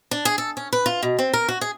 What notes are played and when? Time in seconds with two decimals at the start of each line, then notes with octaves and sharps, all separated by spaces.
0.11 D4
0.25 G#4
0.38 A4
0.57 C#4
0.73 B4
0.86 F4
1.03 B2
1.19 C4
1.33 A#4
1.48 F#4
1.61 G#4